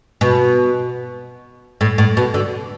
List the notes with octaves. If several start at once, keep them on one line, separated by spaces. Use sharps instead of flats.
B2
A2
A2
B2
D3